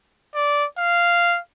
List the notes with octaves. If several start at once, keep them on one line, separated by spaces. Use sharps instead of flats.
D5
F5